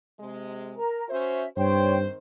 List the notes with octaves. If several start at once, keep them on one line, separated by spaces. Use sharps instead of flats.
C3 G#3
A#4 A#5
C#4 F#4 C5 E5
G2 D#3 C4 C5 C#5 G5 C6